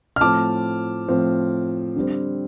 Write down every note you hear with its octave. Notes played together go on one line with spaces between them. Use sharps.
F6
A2 F3 C4 A5 D6
A2 F3 C4
D3 G3 C4